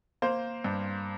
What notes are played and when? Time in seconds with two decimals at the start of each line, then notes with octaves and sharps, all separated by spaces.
0.22 A#3 C5
0.64 G2